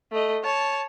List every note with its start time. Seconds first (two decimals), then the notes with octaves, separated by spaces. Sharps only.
0.12 A3 D#5
0.44 C#5 A5